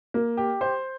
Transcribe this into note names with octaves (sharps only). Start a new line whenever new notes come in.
A#3
G4
C5